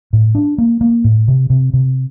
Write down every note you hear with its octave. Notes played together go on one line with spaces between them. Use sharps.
A2
D4
A#3
A#3
A2
C3
C3
C3